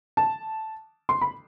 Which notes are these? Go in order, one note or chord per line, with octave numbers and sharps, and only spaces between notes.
A5
C6
B5